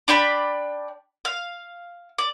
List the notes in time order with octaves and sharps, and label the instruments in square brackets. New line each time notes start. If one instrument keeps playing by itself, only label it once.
[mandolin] D4 D5 G5 B5
F5
D5